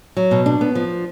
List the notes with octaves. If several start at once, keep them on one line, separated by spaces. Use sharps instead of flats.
F#3
B2
D4
B3
F3